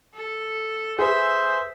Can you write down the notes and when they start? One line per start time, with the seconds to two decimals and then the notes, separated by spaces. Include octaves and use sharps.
0.14 A4
0.99 G#4 B4 C5 E5